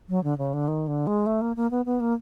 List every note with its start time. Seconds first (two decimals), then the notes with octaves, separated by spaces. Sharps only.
0.09 F#3
0.24 D3
0.38 C#3
0.54 D3
0.68 D#3
0.88 D3
1.07 G#3
1.26 A3
1.41 A#3
1.56 A#3
1.71 B3
1.86 B3
2.00 A#3